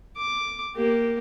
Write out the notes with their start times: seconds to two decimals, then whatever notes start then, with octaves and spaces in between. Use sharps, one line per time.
0.17 D6
0.75 A#3 G4